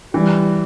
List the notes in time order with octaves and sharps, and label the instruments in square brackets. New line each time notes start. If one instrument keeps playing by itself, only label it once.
[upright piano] E3 [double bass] G3